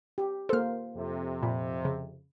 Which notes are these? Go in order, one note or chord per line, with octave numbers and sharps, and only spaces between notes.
G4
A#3 A4 C5 F6
F2 C3
A#2 B5
C#3